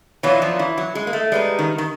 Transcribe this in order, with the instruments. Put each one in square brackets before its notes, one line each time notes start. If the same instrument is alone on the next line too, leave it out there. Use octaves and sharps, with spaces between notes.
[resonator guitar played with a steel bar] E3 [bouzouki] F#3 B3 D4 F4
[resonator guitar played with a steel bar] F3
E3
F#3
G#3
A#3
A3
[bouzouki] G3 B3 D#4 [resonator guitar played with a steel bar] G#3
[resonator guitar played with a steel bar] D#3
D#3